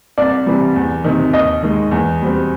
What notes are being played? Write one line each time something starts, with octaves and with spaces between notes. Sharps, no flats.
C2 D5
C3 E3 G3
E2
C3 D#3
D#2 D#5
D#3 G#3
E2
B2 G3 C4